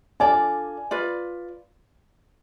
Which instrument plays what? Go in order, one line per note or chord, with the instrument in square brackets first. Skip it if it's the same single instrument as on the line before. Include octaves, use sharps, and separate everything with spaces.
[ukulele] D4 F4 A4 D5 [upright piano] G#5
[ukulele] F4 B4 D5